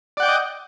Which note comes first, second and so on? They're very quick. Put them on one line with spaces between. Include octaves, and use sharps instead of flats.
D5 F#5 G5 D6 D#5